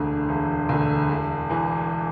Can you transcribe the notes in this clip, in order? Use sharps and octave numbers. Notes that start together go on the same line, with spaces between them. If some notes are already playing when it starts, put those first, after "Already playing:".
Already playing: E1 D2 D3
E1
D2 D3
E1
E2 E3